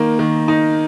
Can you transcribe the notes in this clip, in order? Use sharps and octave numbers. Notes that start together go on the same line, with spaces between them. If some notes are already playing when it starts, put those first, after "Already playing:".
Already playing: D#3 A#3 D#4
D#3
D#4